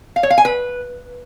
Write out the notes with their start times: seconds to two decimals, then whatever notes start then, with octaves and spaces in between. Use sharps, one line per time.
0.16 F5
0.23 C#5
0.30 F5
0.38 G#5
0.45 B4